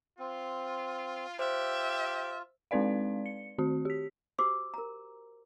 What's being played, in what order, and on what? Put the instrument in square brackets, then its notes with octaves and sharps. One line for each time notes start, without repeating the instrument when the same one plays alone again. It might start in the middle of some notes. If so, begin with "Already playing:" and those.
[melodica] C4 [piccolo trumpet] F4
[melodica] F4 [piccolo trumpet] G4 [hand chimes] C5 [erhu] E5
[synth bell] G#3 C4 D#4 B4 D5 F5
C#7
D#3 C4 F#4
G4 B6
[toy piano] F#4 G4 C5 C6 D6 E6
A#4 A#5